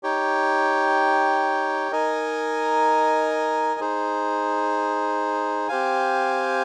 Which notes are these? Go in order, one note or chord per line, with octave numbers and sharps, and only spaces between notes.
D#4 G4 C#5 G5
D#4 A#4 D#5 G#5
D#4 G#4 C5
C4 G4 C5 F5 G#5